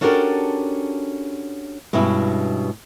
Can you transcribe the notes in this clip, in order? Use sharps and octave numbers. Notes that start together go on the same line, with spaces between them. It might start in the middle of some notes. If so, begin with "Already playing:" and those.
C#4 D4 F#4 G4 A4 A#4
G2 B2 G#3 C#4 E4